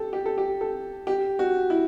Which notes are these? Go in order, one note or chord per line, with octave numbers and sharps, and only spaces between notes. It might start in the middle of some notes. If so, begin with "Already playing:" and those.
Already playing: G4 A4
G4
A4
G4
A4
G4
F#4
E4